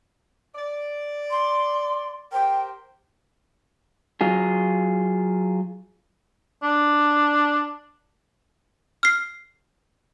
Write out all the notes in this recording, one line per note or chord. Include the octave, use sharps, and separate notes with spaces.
D5
C6
G4 A#4 C5 G5
F#3 F4 G#4
D4
F6 C7